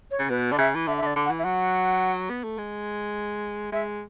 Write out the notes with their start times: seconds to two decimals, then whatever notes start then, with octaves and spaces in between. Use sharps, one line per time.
0.11 C#5
0.19 C#3
0.30 B2 B4
0.51 D3 D5
0.59 C#3 E5
0.75 E3
0.87 D3 E5
0.97 E5
1.02 D3 D5
1.16 D3
1.25 F#5
1.30 E3
1.39 E5
1.44 F#3 F#5
2.30 B3
2.44 A3
2.58 G#3
3.72 G#3 E5